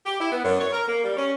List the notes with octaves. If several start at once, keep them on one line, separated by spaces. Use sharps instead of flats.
G4
E4
B3
F#2
C#5
A#4
A#3
G3
C#4